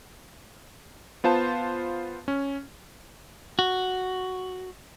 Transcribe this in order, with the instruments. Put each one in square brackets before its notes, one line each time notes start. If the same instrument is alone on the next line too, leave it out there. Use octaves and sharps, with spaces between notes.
[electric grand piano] B3 F4 C5 A5
C#4
[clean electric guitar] F#4